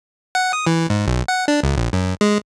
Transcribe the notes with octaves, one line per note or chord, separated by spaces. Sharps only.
F#5
D#6
E3
G#2
B1
F#5
D4
C#2
A#1
F#2
G#3